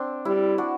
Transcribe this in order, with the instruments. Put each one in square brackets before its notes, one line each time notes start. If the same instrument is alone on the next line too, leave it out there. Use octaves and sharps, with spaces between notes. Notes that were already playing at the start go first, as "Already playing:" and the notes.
Already playing: [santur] C4 D4
[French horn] G3 [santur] E4
[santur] D4 F#4